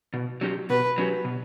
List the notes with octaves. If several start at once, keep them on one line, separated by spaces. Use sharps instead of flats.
B2
F#3 C#4 G4
B2 B4
F#3 C#4 G4
B2